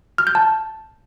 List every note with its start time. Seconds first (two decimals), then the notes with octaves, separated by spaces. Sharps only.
0.18 F6
0.27 G6
0.35 A5